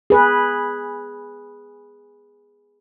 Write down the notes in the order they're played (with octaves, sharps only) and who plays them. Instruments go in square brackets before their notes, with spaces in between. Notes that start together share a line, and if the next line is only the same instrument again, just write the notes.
[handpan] G#4 B4